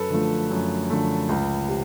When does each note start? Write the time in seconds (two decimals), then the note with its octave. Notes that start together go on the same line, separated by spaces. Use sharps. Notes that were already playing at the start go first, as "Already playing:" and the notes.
Already playing: F#2 A4 B4
0.10 D3 F3 A3
0.51 F#2
0.90 D3 F3 A3
1.29 C#2
1.69 C3